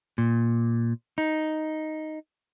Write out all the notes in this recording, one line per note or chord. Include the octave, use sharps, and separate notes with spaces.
A#2
D#4